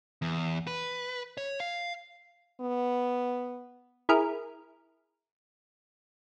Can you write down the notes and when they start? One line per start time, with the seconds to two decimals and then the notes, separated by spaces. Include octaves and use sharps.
0.22 E2
0.67 B4
1.37 C#5
1.60 F5
2.61 B3
4.09 E4 G#4 A#4